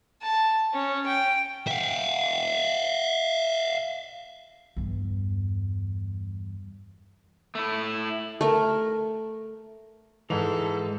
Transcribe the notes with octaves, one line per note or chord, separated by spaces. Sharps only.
A5
C#4
G5
E5 F5
E2 G2
A3 E4
A3 A#4
G#2 E3 G#3 A4 F7